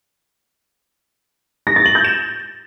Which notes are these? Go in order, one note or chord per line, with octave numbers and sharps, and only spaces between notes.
A#6
A6
F#7
G6
E7